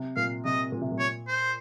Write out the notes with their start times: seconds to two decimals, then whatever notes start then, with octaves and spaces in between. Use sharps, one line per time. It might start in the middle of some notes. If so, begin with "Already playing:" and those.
Already playing: C3
0.17 A#2 F5
0.45 C3 D#5
0.72 A#2
0.81 C3
0.92 A#2
0.99 C#5
1.28 C5